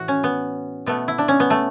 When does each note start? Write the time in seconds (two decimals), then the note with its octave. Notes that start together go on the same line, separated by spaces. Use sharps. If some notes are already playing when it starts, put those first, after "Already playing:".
Already playing: A2 E3 F#4
0.08 C#4
0.24 B3
0.86 B2 A3 B3
1.08 E4
1.18 D4
1.28 C#4
1.40 B3
1.50 A3